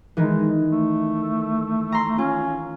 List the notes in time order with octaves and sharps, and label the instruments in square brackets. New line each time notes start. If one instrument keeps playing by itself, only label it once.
[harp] D#3 E3 [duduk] G#3
[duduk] A3
[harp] A#5 C6
[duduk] C#4 [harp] F4